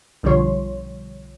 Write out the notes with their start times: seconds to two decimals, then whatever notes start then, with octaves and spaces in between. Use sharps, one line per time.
0.23 B1 D3 F3 G3 C#5 C6